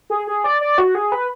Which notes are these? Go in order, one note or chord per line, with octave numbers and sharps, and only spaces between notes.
G#4
G#4
D5
D5
F#4
G#4
B4